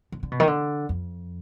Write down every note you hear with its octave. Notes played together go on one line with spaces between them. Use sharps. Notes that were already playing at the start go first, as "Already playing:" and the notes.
D3
D3
B2
D#3
D3
F2